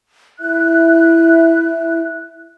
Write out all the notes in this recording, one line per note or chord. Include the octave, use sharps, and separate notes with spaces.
E4 E5 F#6